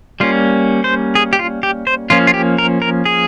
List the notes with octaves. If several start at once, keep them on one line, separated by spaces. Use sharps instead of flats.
G3 A#3 C#4 F4
C5
G#4
G4
F4
G4
C5
F3 A#3 C#4 F4
F4
G4
A#4
A#4
G#4